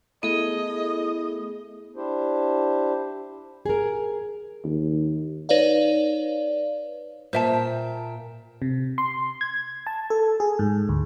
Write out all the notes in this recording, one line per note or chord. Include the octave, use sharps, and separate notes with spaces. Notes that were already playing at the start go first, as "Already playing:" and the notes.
A3 B3 E4 G#4 A4 D#5
D4 E4 G4 C5
G#4 A#4
D#2
D#4 B4 C#5 D5 F5
A#2 C5 E5 G5 A5
C3
C6
G#6
A5
A4
G#4
G#2
D2